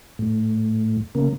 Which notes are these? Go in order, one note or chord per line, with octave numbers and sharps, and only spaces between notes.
A2
C#3 A#3